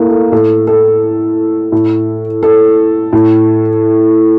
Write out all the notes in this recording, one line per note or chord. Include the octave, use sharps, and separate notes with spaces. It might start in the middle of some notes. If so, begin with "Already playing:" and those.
Already playing: A2 A3 A#3
A4
A2 A4
A4
A2
A4
A2